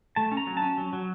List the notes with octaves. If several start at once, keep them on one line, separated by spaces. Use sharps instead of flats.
A3 A5
C#4
A#5
F#3
A5
C#4
F#3
F#3